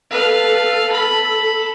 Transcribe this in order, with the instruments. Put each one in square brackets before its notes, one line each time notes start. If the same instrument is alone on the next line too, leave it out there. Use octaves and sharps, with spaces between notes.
[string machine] A4 [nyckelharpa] B4 F5
[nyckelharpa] B5